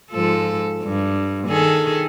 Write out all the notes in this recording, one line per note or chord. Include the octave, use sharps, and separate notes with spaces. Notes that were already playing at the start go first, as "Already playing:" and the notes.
G#2 F3 A4
G2
D#3 G#4 A4